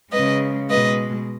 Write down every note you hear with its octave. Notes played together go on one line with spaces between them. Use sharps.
C#3 G#3 B4 D#5
B2 G#3 B4 D#5